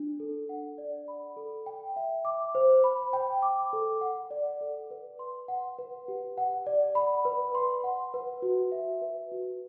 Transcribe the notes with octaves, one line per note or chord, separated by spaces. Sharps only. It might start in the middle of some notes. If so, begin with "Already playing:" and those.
Already playing: D4
A4
F#5
D5
B5
A4
G5
E5
D6
C5
B5
G5
D6
A4
F#5
D5
A4
B4
C6
F#5
B4
G4
F#5
D5
B5
B4
C6
F#5
B4
F#4
E5
B4
F#4